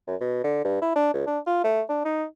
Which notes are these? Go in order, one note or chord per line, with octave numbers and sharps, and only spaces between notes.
F#2
B2
D3
G2
E4
D4
C#2
D4
F4
A3
D4
D#4